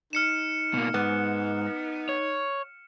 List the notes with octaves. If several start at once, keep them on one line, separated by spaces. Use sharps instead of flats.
D#4 F6 C#7 E7
B2 A#3
G#2 B3
C#5